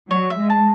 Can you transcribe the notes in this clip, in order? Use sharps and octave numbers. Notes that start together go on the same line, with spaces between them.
F#3 C#5
E5
G#3
A5